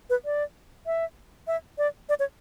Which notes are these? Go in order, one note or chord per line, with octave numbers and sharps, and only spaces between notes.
B4
D5
E5
E5
D5
D5
C#5